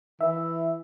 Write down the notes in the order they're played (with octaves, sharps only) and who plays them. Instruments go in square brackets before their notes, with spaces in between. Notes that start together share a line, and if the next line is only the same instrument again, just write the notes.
[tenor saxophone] E3 [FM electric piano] E5